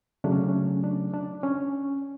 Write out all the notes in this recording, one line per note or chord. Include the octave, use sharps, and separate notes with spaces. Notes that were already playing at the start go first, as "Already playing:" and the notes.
C#3 F#3 A3 D4
C#4
C#4
D4
D4
C#4